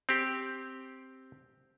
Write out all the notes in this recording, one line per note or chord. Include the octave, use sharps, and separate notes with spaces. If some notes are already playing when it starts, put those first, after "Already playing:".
C4 G4